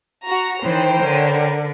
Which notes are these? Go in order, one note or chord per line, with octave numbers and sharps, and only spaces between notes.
F#4 A#5
D#3 E3 C5 C#5 G5 A#5
D3 A#4